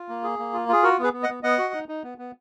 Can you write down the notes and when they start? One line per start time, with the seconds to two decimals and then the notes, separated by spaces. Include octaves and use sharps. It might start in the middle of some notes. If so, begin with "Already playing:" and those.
Already playing: F4
0.09 A#3
0.24 G#4
0.39 A#3
0.53 F4
0.69 F4 G#4
0.83 F#4 A#4
0.99 B3 G#4 B4
1.13 B3
1.23 D#5 F#5
1.29 B3
1.43 B3 D#5 F#5
1.58 F#4
1.74 D#4
1.89 D#4
2.03 B3
2.18 B3